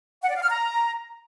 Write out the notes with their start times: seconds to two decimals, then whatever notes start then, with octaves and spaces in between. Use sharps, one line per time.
0.23 F#5
0.30 D5
0.36 F5
0.43 F6
0.50 A#5